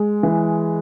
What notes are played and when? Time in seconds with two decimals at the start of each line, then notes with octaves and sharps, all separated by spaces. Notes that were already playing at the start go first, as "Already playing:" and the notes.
Already playing: G#3
0.23 E3